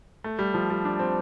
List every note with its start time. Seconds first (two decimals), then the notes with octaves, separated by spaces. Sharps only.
0.24 A3
0.39 G3
0.54 F3
0.70 G3
0.85 D4
0.99 C4